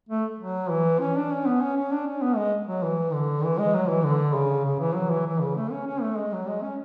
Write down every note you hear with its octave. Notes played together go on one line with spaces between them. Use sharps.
A3
F#3
E3
C#4
D4
C#4
B3
C#4
C#4
D4
C#4
B3
G#3
F#3
E3
D3
E3
G#3
F#3
E3
D3
C#3
C#3
E3
F#3
E3
E3
C#3
A3
C#4
C#4
A3
G#3
F#3
G#3
C#4